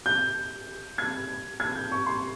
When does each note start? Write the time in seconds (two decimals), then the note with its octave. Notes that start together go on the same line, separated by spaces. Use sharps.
0.06 G6
0.98 G#6
1.60 G#6
1.75 G6
1.92 C#6
2.06 C6